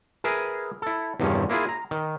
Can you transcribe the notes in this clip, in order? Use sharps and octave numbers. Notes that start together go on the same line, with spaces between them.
G#4 A#4 B4 E5 G#5
E4 A4
E2 G2 C3 D#3 F3 C#4
A#3 E4 F4 G#4
A#5
D#3